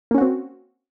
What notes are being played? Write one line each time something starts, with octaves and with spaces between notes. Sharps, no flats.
A#3 C4 C#4 F#4